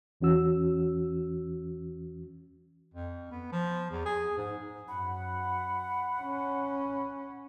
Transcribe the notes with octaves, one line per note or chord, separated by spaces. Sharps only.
E2 E3 C#4 F#4 E6
F2
B3
F3
E2
G#4
G#2
F#2 F#5 B5
C#4